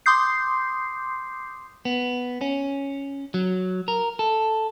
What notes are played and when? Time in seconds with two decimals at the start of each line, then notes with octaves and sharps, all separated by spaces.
0.06 C6 D6 D#6 G6 C7
1.85 B3
2.41 C#4
3.34 F#3
3.88 A#4
4.19 A4